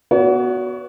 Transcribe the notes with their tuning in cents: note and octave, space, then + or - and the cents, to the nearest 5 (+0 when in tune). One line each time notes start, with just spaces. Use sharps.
B3 +0 F#4 +0 C#5 +45